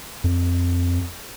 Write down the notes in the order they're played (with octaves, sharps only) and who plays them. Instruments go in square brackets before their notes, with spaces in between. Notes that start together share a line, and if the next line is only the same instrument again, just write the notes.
[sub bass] F2